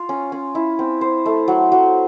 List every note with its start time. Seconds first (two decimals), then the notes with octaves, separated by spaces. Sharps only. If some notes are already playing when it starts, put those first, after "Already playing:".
Already playing: F4
0.09 C#4
0.32 C#4
0.55 E4
0.79 C4
1.01 C5
1.26 A3
1.48 F#3
1.72 F#3